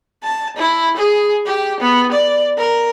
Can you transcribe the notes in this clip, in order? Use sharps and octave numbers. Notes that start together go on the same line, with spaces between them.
A5
E4
G#4
G4
B3
D5
A#4